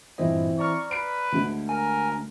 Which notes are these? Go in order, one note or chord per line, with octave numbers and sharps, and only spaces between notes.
G2 A#2 E3 C4 E4 D#5
D5 A#5 C#6 F6
B4 C7 D7
D2 D3 G#3 A3
A#4 G#5